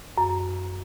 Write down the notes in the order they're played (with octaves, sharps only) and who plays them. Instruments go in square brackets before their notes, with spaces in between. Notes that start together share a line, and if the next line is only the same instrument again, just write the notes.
[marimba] F#2